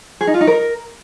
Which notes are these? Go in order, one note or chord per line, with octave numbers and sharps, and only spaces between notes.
G#4
D#4
F4
D#4
A#4